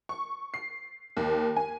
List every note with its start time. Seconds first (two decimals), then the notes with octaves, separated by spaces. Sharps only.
0.09 C#6
0.54 C7
1.17 D#2
1.57 G#5